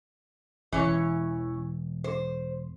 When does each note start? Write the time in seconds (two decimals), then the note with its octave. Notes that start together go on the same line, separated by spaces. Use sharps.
0.72 E1 E3 C#4 C#5
2.04 C5